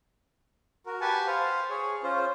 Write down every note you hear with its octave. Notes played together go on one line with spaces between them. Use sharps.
F#4 A#4
G4 B4 F#5 G#5 A5
C5 F5
G#4 C#5
C#4 F4 C5